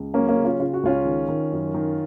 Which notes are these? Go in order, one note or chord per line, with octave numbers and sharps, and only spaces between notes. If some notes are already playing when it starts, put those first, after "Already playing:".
Already playing: C#2
F#3 A#3 C#4
A#3 C#4
C#3
C#4 F4
C#3 F4
F#4
C#2 C#4 F4
D#3
D#3
F#2
D#3